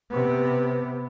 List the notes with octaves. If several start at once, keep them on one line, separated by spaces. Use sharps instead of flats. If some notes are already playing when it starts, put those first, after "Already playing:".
C3 B3